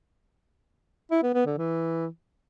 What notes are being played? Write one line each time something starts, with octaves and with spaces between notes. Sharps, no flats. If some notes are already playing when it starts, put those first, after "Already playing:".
E4
B3
B3
D3
E3